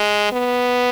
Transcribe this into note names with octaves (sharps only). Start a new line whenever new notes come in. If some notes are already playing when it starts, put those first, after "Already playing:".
Already playing: G#3
B3